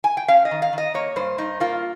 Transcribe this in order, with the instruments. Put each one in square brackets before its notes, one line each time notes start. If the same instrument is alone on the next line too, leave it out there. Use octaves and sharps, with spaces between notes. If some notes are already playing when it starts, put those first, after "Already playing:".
[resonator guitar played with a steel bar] G#5
G5
C#4 F5
D#5
D#3
F5
D#3 D#5
A#3 C#5
G2 C5
G2 D#4
A#3 F4